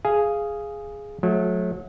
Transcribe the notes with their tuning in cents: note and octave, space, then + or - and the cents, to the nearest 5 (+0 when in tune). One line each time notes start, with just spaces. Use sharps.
G#4 +0 F5 -10 G#5 +0
F#3 -35 A3 -25